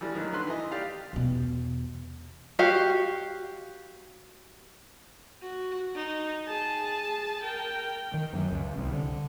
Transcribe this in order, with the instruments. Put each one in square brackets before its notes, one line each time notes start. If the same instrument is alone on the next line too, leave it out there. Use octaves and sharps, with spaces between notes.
[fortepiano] E3 F3 G3
D#3 F3 F#3 D#4
D3 B4 C6
E3 D#5
G4 D5 F5
[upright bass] E2 B2
[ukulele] F#4 G4 F5
[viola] F#4
D#4
G#4 A5
A#4 G5
[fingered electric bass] D#3
F#2
C#2
C2
D3